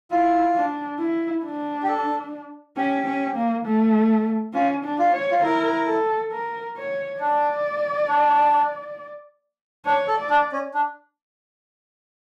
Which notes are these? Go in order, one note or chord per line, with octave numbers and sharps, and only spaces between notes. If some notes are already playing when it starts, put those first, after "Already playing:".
E4 F4
D4
E4
D4
G4
A4
C#4 G4
C#4
A#3
A3
C#4 F4
D4
F4
C#5
F4
E4 A#4
A4
A#4
C#5
D4 D5
D4
D4 C#5
A4
D5
D4
C#4
D4